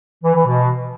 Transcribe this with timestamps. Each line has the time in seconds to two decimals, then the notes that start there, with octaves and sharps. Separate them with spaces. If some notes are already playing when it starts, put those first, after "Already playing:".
0.24 E3
0.35 E3
0.46 B2